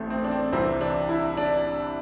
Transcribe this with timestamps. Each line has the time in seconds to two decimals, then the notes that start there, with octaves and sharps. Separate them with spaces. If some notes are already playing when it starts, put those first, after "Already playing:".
Already playing: A1 A3 C4
0.10 C4
0.24 D4
0.31 C4
0.52 C2 C3 E3 C4
0.81 D4
1.09 E4
1.37 D4